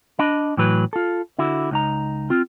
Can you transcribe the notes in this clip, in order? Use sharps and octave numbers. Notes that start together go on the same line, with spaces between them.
D4 D#5 B5
A2 E3 F#3 B4
F4 A4
D3 E4 F#4
C#2 D#4 A#5
C4 F4